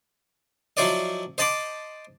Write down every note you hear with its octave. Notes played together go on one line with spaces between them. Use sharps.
F3 F#3 E4 C5 D5 D#5
C5 D#5 A5 B5 C6 D6